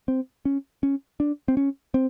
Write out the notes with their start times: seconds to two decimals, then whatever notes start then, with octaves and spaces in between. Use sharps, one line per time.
0.08 C4
0.45 C#4
0.83 C#4
1.20 D4
1.48 C4
1.57 C#4
1.94 C4